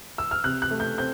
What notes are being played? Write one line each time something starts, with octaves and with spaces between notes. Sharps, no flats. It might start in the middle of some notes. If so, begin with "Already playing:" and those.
E6
F6
C3 F#6
F#6
A3
G6
C4 G6